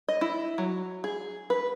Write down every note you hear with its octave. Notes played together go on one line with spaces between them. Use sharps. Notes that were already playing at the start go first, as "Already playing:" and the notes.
D#5
E4
F#3
G#4
B4